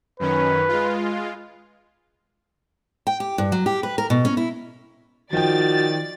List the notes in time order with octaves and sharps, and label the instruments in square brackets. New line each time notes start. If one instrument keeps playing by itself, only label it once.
[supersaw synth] F#2 D#3 C#4 [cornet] B4
[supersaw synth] G#3 F4
[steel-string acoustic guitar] G5
G4
G2
F#3
G4
B4
A#4
B2
C#4
E4
[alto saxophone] D#3 [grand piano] F3 G5 [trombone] F#4 [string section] D5 A6